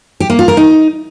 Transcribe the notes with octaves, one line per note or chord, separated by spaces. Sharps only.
G4
A#3
F4
A#4
D#4